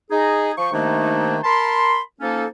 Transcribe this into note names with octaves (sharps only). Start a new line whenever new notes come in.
D#4 G#4
F3 C#6
C3 D#3 A3 A#3 D4 D#4
A#4 A5 B5 C6
F3 A#3 C#4 D#4 A4